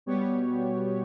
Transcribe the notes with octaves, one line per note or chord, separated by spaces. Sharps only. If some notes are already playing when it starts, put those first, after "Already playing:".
B2 G3 B3 G4 C#5